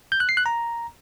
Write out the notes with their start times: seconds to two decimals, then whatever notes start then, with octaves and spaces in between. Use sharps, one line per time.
0.12 G6
0.20 F#6
0.29 C7
0.37 F#6
0.46 A#5